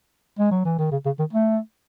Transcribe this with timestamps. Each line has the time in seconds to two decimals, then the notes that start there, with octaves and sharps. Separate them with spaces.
0.39 G#3
0.52 F#3
0.65 E3
0.78 D#3
0.92 C#3
1.06 C#3
1.19 D#3
1.33 A3